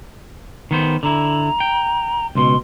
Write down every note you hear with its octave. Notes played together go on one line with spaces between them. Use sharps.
D#3 B3 C5
D3 E4 A#5
G5
C#2 B2 C6